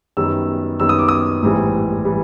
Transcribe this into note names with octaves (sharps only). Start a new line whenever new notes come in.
F#2 D#3 G3 B3 E6
F#2 D#3 G3 B3 E6
D#6
D6
D#6
A1 G#2 E3 G3
E3 G3